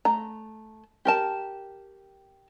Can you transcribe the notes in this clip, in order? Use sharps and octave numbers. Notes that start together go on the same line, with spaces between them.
A3 A#5
G4 A#4 A5